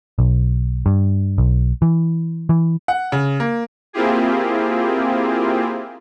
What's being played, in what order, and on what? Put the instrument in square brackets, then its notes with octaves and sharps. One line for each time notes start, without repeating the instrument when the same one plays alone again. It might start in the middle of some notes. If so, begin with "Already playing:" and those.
[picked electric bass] B1
G2
B1
E3
E3
[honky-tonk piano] F#5
C#3
A#3
[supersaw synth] A#3 C4 E4 F4 G4 G#4